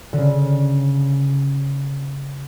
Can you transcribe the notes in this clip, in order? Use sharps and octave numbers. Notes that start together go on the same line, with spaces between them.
D3
C#3